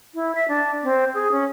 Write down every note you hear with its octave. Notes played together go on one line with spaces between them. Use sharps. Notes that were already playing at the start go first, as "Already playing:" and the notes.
E4
E5
D4
C4
G#4
C#4